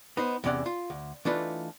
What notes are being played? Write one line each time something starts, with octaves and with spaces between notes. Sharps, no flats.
B3 D#4 C5
E2 C3 C#4 D5 F#5
F4
D2
E3 A3 D4 D#4 F4 B4